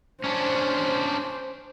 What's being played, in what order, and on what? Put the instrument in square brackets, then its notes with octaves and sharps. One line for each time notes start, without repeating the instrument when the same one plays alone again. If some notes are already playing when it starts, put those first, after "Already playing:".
[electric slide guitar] C#4 D4 [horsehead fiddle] C5